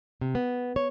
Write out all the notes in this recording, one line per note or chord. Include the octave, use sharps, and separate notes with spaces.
C3
B3
C#5